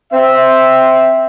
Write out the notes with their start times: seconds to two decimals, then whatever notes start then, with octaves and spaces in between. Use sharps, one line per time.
0.12 C4 E5